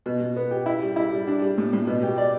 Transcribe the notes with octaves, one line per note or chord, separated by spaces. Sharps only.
B2
B2
B3
G4
E4
G3
E4
G3
D4
G3
A2
A2
B2
G4
D5